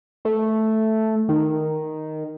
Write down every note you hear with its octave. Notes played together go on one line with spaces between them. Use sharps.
A3
D#3